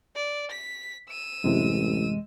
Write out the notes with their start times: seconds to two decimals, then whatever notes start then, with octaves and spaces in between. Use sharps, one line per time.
0.15 D5
0.51 B6
1.10 E6 D#7
1.44 A1 F#2 C3 E3 G#3